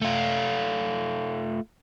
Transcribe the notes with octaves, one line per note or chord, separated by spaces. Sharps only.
A3 F4